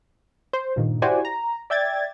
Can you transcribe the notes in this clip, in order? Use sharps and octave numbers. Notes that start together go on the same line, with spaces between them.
C5
G2 A#2 D#3
E4 F#4 G4 C5 D5 G#5
A#5
D5 E5 G5 G#6 A6